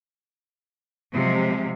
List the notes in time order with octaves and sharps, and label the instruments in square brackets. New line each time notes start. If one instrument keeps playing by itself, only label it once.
[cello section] C3 F3 F#3 G#3